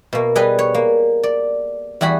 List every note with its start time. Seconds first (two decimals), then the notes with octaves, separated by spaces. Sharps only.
0.13 B2 A#3
0.35 G3 G#4 B4 D#5
0.59 C#5
0.75 A#3
1.23 D5
2.01 E2 G3 F#4 G#4 B5